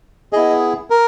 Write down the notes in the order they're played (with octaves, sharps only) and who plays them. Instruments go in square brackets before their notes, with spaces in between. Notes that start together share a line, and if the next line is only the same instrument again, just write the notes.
[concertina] B3 E4 G#4 D#5
A#4